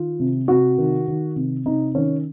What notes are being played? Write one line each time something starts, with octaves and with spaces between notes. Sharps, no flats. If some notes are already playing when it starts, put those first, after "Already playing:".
Already playing: D#3 F4
C3
C3 F#4
D#3
D#3
C3
C3 D#4
D#3 C#4